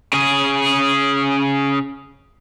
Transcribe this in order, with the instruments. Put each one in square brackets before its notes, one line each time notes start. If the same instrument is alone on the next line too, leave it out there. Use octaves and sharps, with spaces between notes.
[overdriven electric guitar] C#3 G#4